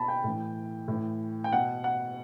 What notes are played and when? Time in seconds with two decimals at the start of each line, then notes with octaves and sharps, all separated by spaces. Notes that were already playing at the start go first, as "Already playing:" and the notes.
Already playing: B2 A5 B5
0.08 G5
0.24 A2 E3
0.88 A2 E3
1.44 G5
1.52 B2 F#5
1.84 F#5